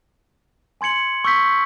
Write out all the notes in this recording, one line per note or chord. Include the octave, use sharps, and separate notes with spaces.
G#5 C6 G#6 C#7 F#7
C#6 E6 G6 B6